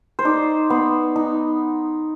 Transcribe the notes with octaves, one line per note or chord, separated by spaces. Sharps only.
C5
D#4 D5
B3
D#4